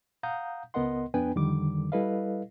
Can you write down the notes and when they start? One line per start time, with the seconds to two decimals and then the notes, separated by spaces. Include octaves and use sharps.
0.23 F5 F#5 A#5 D#6 G6
0.74 C#2 B3 A#4 D#5 F#5 C6
1.14 F2 B3 D4 B4 G5 G#5
1.35 F2 D3 D#3 G3 D6
1.92 G3 E4 A4 B4 D#5 F5